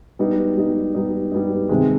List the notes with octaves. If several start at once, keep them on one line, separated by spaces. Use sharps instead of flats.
G3 B3 D#4
G3 B3 D#4
G3 B3 D#4
G3 B3 D#4
C3 D#3 G#3